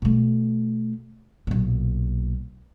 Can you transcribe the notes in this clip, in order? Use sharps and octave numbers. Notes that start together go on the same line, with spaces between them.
B2 A3
B1 A#2